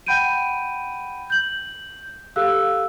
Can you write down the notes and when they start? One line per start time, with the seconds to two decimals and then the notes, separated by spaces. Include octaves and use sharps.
0.06 F#5 G5 B5 G6 D7 D#7
1.30 G6 F#7
2.36 G4 A4 F5 E6 F#6